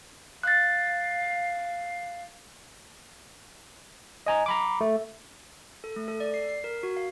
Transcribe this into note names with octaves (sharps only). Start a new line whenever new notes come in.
F5 F#6 A6
D#5 G#5 A#5
A#5 B5 D6
A3
A4
A3
A4
D5
C7
C7
A#4
F#4
F5